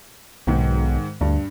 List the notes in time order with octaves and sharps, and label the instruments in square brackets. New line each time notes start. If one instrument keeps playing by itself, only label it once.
[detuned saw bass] B1 [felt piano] G#2 D#3
[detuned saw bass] D2 [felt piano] G2